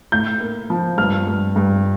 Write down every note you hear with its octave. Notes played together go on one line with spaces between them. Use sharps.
A2 G6
A#3
F3
G2 F6
G2
G2